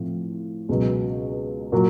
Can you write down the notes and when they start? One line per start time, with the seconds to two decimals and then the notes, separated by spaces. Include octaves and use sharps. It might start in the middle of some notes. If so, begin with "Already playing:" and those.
Already playing: A2 F3 A3 C4 F4
0.69 C#2 B2 F#3 B3
1.72 A#2 F#3